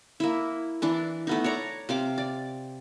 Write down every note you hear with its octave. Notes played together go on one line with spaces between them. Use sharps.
A#3 E4
E3 D4 D5
A3 B3 D#4
C#5 D5 A#5
C3 F5 D6
D5